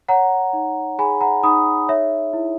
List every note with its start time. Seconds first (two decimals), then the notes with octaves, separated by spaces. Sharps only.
0.09 C#5 F#5 A#5
0.53 D#4
0.98 G#4 G#5 B5
1.21 F#5 A#5
1.43 D#4 B5 D#6
1.88 C#5 E5
2.33 E4